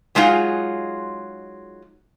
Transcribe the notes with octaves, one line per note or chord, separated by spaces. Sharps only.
F#3 G#3 D#4 F4 G#4